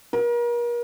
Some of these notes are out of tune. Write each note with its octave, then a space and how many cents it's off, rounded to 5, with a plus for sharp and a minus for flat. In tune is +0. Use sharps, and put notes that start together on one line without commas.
A#4 +40